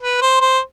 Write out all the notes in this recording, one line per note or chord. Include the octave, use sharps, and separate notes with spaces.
B4
C5
C5